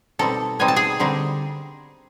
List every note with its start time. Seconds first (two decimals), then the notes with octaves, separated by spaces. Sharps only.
0.19 B2 G3 C4 D#4 A4 A5
0.59 B2 G3 C4 D#4 G#5
0.68 A5
0.76 G#4 G#5
1.00 D3 G3 C4 D#4